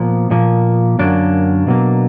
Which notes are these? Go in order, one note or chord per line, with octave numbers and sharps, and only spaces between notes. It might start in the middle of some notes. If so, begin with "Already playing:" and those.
Already playing: A#2 F3 A#3 B3
A#2 F3 A#3
F#2 D3 F#3 A#3 D4
B2 F#3 A#3